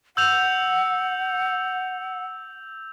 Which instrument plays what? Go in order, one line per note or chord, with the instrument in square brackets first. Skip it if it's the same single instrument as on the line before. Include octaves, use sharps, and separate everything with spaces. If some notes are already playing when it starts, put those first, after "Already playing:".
[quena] F#5 [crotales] E6 G6 F7